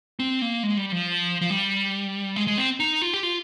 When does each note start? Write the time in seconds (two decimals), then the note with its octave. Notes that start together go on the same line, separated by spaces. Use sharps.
0.19 C4
0.42 A#3
0.63 G#3
0.77 G3
0.92 F3
1.42 F3
1.50 G3
2.36 G#3
2.47 G#3
2.58 C4
2.80 D#4
3.02 F4
3.14 G4
3.23 F4